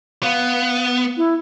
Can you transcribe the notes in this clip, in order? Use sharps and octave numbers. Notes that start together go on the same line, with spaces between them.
B3 F5
E4